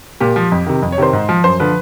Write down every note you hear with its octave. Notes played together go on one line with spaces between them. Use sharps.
A#2 G4
F3
F2
C3 D#3
F2
C#5
C3 D#3 C5
G#2
F3
F#2 C5
D3 F3 B4